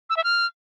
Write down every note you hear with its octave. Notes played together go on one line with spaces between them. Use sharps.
E6
E5
F6